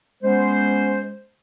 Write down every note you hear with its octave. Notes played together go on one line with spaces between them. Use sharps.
G#3 B3 C#4 C5